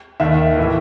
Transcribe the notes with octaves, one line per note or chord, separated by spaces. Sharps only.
D#2 D#3 E5
A2 E3